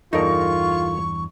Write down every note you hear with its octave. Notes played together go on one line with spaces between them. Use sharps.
E2 G2 D#4 F4 A4 A#4 C#6